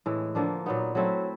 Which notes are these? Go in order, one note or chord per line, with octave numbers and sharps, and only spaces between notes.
A2 E3 G#3
D3 F3 A#3 D4
A#2 F#3 B3 D#4
F#3 A3 C4 E4